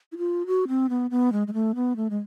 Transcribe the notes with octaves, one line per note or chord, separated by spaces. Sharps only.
E4
F4
F#4
C4
B3
B3
G#3
G#3
A3
B3
A3
G#3